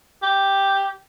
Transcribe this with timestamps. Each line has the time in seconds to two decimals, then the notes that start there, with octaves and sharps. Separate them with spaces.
0.22 G4